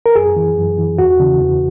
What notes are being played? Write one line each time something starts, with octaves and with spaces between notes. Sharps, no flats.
A#4
F#2 G#4
E3
F#2
E3
E2 F#4
C#3 E3
E2